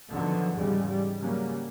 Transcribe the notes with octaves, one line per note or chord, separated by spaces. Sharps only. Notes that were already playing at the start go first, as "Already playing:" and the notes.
D3 D#3 F3 F#3 B3
E2 G#2 C#3 G3 G#3
G3
C#3 F#3 G3 A#3